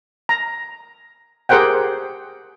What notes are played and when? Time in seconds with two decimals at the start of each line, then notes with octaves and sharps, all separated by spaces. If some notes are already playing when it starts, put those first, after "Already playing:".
0.29 A#5
1.49 G4 G#4 A#4 C5 F#5 G5